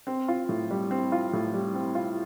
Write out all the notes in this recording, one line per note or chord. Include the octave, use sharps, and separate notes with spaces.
C4
F4
A2
G3
C4
F4
A2
G3
C4
F4